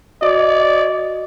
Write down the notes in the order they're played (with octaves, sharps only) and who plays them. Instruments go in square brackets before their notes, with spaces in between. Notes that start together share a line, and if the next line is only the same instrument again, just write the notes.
[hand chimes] F#4 D#5 [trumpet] D5